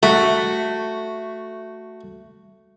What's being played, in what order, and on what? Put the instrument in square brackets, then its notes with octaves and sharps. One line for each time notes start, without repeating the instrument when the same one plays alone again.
[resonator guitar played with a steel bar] A3 [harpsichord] F#4